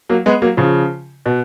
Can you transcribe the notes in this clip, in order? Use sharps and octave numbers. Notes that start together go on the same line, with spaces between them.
F#3 A#3
G#3 B3
F#3 A#3
C#3 F3
B2